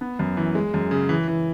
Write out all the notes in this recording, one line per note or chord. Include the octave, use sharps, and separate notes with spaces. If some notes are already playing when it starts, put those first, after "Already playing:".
B3
F#2
E3
G#3
F#2
C#3
E3
E3